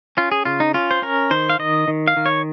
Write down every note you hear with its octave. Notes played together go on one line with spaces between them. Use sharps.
C#4 F4
G#4
C#3 F4
D#4
C#4 F4
C5
C#4 A#4
D#3 C5
F5
D#3 D#5
D#3
F5
D#3
C#5